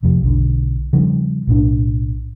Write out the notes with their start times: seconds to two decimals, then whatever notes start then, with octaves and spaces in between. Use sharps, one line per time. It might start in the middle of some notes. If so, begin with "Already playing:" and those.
0.03 C2 F2 C3
0.23 B1 D3
0.93 C#3 F3 G3 C4
1.47 B1 A2 D4